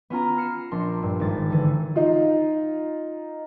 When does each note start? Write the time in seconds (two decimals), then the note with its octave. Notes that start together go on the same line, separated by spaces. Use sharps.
0.10 B3 C#4 F4 A#5
0.37 F6 C7 C#7 E7
0.71 A#1 D4 C6
1.03 G2
1.20 G#1 A6
1.50 D3 E3
1.96 D#4 F4